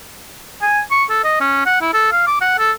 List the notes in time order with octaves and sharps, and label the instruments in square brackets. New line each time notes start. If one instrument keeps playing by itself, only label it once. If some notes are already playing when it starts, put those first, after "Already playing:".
[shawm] G#5
C#6
A4
D#5
C#4
F#5
E4
A4
F5
D6
F#5
A4